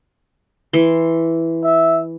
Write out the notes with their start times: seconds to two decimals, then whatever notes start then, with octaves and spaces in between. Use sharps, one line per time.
0.73 E3 C6
1.63 E5